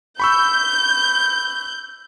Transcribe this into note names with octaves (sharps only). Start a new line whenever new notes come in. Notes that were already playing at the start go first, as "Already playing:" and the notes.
B5 C#6 E6 G6